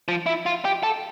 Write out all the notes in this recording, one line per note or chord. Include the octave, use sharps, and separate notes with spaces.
F3
E4
F4
G4
A4